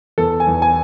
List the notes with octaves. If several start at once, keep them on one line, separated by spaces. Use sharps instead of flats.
E2 A4
G#5
E2
G#5